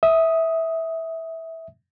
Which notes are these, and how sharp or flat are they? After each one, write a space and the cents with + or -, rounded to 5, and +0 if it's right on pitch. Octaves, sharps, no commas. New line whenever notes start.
E5 -15 D#6 +5